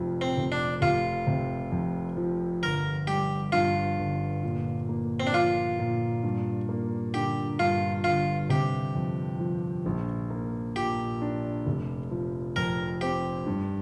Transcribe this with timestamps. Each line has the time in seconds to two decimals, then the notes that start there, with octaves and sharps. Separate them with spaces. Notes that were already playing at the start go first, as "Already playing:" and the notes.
Already playing: F1 F2 F3
0.21 C4
0.37 F1
0.52 D4
0.81 F1 F4
1.27 C3
1.72 F2
2.17 F3
2.62 G1 A#4
3.07 G3 G4
3.52 G2 F4
3.99 G1
4.43 A#2
4.89 A#3
5.20 C4
5.27 D4
5.33 F3 F4
5.79 A#2
6.23 G2
6.69 A#3
7.14 D3 G4
7.59 G2 F4
8.04 G1 F4
8.49 C3 G4
8.95 F2
9.40 F3
9.86 A#1
10.30 A#3
10.76 A#2 G4
11.22 D4
11.66 F1
12.11 F3
12.56 F2 A#4
13.01 C4 G4
13.46 G2